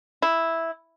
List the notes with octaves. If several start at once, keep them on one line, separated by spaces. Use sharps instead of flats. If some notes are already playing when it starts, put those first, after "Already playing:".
E4